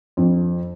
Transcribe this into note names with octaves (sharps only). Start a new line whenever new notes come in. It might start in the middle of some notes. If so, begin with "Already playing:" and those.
F2